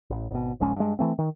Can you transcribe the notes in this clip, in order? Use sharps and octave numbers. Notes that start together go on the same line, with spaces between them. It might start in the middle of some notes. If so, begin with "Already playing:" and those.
A1
G#1 B2
D#1 A#1 G#3 C#4
G2 G#3
E3 A3 C4
D#3